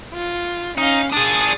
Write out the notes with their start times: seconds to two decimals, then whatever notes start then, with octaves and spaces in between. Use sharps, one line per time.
0.14 F4
0.78 C#4 D#4 F5
1.12 D4 G#4 D#6 A6